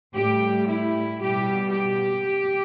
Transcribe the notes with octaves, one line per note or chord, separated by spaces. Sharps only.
A2 G3 G4
E4
B2 G3 G4
G4